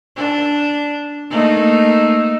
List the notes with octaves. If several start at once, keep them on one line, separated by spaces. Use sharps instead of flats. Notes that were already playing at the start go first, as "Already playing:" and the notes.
D4
A3 A#3 D#4